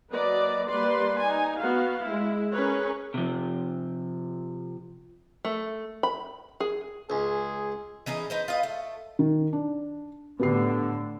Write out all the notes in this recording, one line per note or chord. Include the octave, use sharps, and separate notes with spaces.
F#3 A#3 B4 D5 D#5
G3 A#3 B4 D5 C6
D#4 G#5
B3 F#4 F5
G#3 E4
C#4 G#4 A#4 B4 C#5
C3 F3
A3
B5
G#4
C#2 G#4
E3 C#4 D#4 G#4
D#4 B4 C5
F4 B4 D#5
A3
D#3
D4
A2 D3 B3 G4 C7